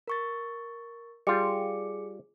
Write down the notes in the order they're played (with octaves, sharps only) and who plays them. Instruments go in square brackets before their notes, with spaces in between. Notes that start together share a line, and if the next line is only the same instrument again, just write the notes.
[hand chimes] A#4 C#6 A6
[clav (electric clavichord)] G3 F4 [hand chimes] G#4 D6 C#7